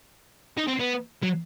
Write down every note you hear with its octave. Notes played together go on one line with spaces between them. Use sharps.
D#4
C4
B3
F#3